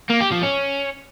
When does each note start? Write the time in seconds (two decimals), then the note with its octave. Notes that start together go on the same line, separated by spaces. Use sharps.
0.10 A#3
0.21 G4
0.32 F3
0.43 C#4